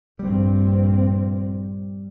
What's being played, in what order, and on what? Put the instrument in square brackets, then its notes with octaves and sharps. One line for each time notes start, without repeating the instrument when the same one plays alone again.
[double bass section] A#1 G2 C4 [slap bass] G3